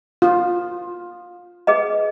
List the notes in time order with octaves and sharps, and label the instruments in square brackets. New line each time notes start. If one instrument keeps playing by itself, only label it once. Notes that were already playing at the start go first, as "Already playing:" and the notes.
[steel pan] F4
[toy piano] G#4 B4 D#5